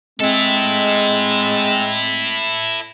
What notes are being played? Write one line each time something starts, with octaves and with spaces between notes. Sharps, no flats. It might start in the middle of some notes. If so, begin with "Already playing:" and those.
G#3 C4 E4 A4